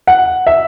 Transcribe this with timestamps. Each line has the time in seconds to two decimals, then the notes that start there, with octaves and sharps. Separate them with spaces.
0.07 F#5
0.47 E5